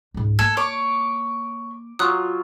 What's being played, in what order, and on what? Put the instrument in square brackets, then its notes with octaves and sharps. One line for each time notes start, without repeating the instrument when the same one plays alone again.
[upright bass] C#2 G#2
[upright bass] A#3 [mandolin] A4 [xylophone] G#6
[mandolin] C#5 [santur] D6
[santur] F#3 F4 [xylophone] D#6 F#6